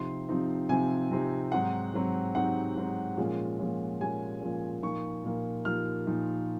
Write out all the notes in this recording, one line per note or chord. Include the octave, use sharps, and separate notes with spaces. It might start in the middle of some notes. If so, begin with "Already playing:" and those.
Already playing: C3 F3 C4 D#4 C6
C3 F3 C4 D#4
C3 F3 C4 D#4 G#5
C3 F3 C4 D#4
G#2 F#3 C4 D#4 F#5
G#2 F#3 C4 D#4
G#2 F#3 C4 D#4 F#5
G#2 F#3 C4 D#4
A#2 F3 G#3 C#4
A#2 F3 G#3 C#4
A#2 F3 G#3 C#4 G#5
A#2 F3 G#3 C#4
A#2 F3 A#3 D#4 C#6
A#2 F3 A#3 D#4
A#2 F3 A#3 D#4 F6
A#2 F3 A#3 D#4